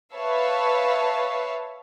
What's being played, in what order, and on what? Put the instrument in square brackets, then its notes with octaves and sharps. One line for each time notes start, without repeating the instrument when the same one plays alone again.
[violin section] B4 C#5 E5 F5 A5